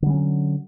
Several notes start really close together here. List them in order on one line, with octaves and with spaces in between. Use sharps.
D3 G3 C#4 F#3